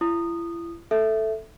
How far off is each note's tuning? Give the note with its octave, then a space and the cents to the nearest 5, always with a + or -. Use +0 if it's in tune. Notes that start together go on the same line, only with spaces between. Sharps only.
E4 +40 D#6 -15
A4 +0 E5 +0